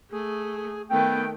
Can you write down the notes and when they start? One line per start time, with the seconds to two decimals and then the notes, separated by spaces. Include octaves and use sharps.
0.11 A3 G#4
0.91 D#3 A3 B3 G5